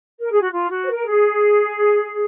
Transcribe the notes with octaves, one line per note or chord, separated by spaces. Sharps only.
A#4
G#4
F#4
F4
F#4
C5
A#4
G#4